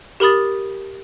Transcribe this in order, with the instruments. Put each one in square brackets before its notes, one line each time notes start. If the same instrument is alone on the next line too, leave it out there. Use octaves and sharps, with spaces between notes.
[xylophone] G4 A#4 B5 D#6 A6